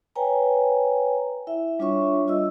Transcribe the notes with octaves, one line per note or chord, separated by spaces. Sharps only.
B4 C#5 G5 G#5 A#5
E4 E5
G3 D4 F4 C#5 E5 C#6
F4 D#5 E6